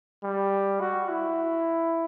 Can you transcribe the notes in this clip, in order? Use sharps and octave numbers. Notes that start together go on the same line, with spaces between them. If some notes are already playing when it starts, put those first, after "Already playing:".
G3
F#4
E4